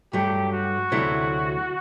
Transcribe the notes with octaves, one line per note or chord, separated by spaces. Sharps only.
G2 F#3 A3 G4
F#4
D2 C3 F#3 A3 E4